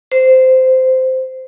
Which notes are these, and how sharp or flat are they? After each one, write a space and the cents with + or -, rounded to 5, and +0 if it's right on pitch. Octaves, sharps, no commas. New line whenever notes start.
C5 -15